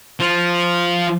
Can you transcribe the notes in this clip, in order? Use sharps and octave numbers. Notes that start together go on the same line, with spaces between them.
F3 F4